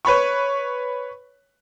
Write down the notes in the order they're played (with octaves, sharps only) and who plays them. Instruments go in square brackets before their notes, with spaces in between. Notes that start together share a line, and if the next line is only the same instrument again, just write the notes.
[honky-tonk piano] B4 C#5 B5 C#6